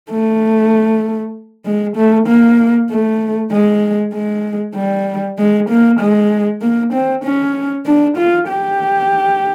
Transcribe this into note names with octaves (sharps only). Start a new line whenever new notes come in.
A3
G#3
A3
A#3
A3
G#3
G#3
G3
G#3
A#3
G#3
A#3
C4
C#4
D4
F4
G4